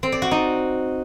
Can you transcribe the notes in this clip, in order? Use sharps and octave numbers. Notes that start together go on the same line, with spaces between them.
C4
D5
F#4
D#4